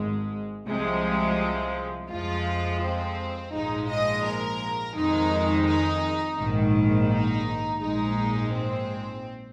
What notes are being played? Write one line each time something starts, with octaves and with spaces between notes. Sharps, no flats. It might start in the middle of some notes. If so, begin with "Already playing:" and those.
Already playing: G#1 G#2 G#3
C2 C3 F3 G#3
F2 F3 G#3 F4
C4
A#1 G#2 F3 G#3 D#4
D#5
A#4
F2 D#3 G#3 D#4
D#4
A#1 G#2 D#3
D#4
A#1 G#2 G#3 D#4
C4